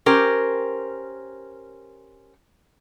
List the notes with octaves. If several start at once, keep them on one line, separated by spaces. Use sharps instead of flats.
C#4 G4 A#4 C5